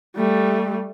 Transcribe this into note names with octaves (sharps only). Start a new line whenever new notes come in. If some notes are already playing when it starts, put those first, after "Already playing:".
G3 A3